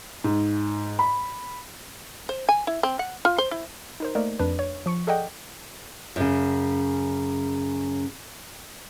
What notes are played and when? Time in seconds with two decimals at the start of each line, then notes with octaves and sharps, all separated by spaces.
0.24 G#2
0.99 B5
2.29 C5
2.49 G#5
2.67 E4
2.83 C4
2.99 F#5
3.25 F4
3.38 C5
3.51 E4
4.00 D#4 A#4 C5
4.15 A3 A#3 A#4 D5 D#5
4.39 F2 D4 B4
4.59 C#5
4.86 F3 C#6 C#7
5.07 G#4 A4 D5 D#5 F#5 G5
6.16 F#2 C#3